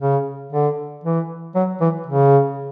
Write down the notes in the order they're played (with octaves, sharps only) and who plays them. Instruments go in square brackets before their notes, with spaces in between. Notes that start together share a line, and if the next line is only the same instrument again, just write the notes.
[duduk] C#3
D3
E3
F#3
E3
C#3